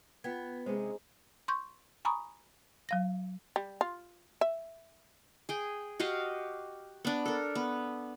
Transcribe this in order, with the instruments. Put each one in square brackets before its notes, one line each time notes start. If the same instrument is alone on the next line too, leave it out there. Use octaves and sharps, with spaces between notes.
[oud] B3 [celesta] F4 G5 G#6
[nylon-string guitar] C3 G#3 [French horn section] C#4 D#4 G#4 [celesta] C5
[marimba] C6 C#6 G6
G#5 A#5 B5 C#6 D#6
F#3 F5 A#6
[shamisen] G3
F4
E5
[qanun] G#4 G5
F#4 G4 D#5 F5
B3 D4
A4 A#4
B3